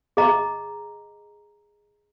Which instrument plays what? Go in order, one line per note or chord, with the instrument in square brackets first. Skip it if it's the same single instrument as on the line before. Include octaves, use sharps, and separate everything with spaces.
[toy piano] G#4 D#5 A#5